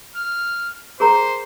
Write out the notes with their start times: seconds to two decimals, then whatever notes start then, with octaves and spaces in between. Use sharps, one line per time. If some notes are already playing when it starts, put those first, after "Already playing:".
0.16 F6
1.00 G#4 A#4 C5 A#5